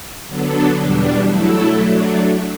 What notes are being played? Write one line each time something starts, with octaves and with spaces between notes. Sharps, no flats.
D3 F#3 B3 D4 A4
E2 B2 G3 D4
F#3 A3 E4 A4
F#3 A3 D4